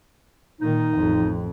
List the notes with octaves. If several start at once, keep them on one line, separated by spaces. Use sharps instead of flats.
A#2 D#3 D#4
A1 F2